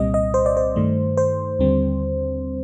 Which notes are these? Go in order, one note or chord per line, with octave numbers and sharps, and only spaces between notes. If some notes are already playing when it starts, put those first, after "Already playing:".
Already playing: C2 A#2 G3 C4 D#5
D#5
C5
D5
C5
G2 D#3 A3
C5
D#2 D3 G3 C4